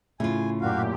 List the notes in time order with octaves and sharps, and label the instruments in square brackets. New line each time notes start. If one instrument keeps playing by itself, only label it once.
[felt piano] A2 [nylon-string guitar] C#3 F4 [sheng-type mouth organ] G#5
[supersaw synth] F#2 A#2 G4 [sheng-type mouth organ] F#4 F5